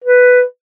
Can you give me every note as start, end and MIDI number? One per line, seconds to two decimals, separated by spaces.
0.04 0.42 71